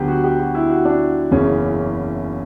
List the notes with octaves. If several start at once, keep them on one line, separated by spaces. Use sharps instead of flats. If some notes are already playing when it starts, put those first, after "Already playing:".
Already playing: D2 D3 F#3 B3 G4
F#4
G4
F#4
E4
F#4
D4
F#1 E2 C#3 E3 C#4